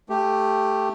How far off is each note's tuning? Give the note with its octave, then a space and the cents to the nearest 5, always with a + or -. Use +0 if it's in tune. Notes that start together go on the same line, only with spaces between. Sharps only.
A3 +0 G4 +0